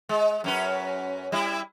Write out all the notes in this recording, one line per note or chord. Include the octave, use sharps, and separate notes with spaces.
G#3
F#2 C#4 B4
G3 E4